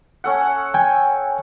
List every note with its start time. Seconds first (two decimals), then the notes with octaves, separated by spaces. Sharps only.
0.24 C#4 A4 F#5
0.74 G5 G#5